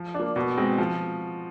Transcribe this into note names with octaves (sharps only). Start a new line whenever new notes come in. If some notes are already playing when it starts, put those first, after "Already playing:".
Already playing: F3
D4
A#3
B2
G#3 C4
F3